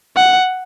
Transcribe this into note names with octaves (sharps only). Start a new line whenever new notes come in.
F#5